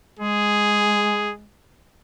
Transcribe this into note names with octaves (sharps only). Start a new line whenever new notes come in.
G#3 G#4